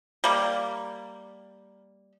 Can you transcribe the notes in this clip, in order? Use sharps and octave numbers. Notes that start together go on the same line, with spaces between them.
G3 A#3